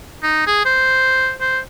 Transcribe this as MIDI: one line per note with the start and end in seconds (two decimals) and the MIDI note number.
0.23 0.47 63
0.47 0.64 68
0.66 1.32 72
1.41 1.59 72